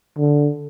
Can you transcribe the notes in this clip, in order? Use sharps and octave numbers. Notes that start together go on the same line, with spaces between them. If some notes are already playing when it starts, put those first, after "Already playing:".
D3